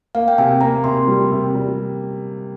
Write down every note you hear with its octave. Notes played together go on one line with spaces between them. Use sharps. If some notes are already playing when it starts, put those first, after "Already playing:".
A#3 F5
G5
C3 G#5
A#3 A#5
C3 C6
G3
C3
G3